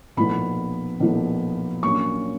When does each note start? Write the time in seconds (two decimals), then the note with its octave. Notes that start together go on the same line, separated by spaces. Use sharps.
0.17 B1 A#2 F3 B3 B5
1.00 B1 A#2 F3 B3
1.83 A#1 A#2 F#3 A#3 C#4 C#6